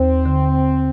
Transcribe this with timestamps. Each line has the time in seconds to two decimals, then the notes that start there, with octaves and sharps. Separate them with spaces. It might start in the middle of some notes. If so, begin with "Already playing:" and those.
Already playing: D#2 C4
0.25 D3